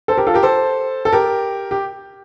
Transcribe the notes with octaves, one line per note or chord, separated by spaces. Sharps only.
A4 C5
G4 A#4
F4 A4
G4 A#4
A4 C5
A4
G4 A#4
G4